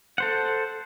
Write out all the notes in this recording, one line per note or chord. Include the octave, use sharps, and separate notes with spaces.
A4 C5 F#5